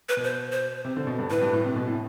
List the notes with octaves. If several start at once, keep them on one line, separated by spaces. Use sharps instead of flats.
B4
B2
C5
C5
C3
D3
B2
G2
A2 B4
G2
A2
C3
B2
A2